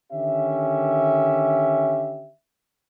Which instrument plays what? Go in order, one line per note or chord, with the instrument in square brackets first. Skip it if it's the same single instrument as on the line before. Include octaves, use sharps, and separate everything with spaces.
[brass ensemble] D3 D#3 C#4 G4 E5